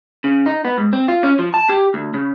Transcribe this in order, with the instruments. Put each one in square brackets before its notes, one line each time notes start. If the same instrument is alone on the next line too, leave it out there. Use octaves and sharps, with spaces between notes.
[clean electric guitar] C#3
D#4
B3
G#2
C4
F4
C#4
F3
A5
G4
D2
C#3